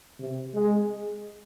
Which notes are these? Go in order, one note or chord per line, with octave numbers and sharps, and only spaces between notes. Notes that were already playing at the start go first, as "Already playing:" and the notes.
C3
G#3